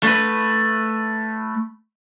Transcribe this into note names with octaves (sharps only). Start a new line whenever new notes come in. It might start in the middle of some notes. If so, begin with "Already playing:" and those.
A3 B4